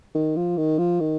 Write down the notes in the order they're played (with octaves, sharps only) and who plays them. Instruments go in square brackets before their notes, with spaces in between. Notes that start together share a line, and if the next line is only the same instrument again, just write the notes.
[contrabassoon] D#3
F3
D#3
F3
D#3